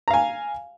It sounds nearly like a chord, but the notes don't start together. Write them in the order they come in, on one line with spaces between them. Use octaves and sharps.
A#5 F5 G#5